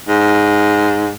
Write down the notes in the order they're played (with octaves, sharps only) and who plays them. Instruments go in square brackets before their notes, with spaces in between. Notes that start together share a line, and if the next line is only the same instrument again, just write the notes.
[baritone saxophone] G#2